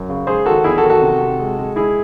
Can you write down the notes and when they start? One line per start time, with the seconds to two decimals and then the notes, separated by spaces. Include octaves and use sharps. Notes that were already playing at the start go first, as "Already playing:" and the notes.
Already playing: F#2
0.09 C#3
0.27 G#3 G#4 C5
0.46 D#3 F#4 A4
0.64 E2 E4 G#4
0.78 F#4 A4
0.84 D#3
0.90 F#4 A4
1.02 C3
1.21 C3
1.39 G#3
1.58 G#3
1.76 G#3 E4 G#4